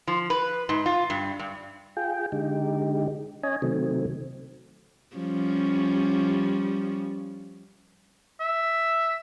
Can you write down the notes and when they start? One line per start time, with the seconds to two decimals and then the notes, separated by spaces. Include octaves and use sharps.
0.07 F3
0.30 B4
0.69 G#2
0.86 F4
1.10 G2
1.39 G2
1.97 F4 G#4 G5
2.32 D3 G#3 D#4 G4
3.43 C#4 C#5 D#5 G#5
3.62 C3 D#3 F#3 A3 C4
5.16 F3 G3 C#4
8.40 E5